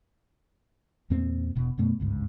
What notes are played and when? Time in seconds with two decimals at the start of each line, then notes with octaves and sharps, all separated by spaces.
1.10 E2 A#2 A#3 C4
1.55 E1 B2
1.78 F#2 B2 A3 B3
2.00 G1 C#2 G#2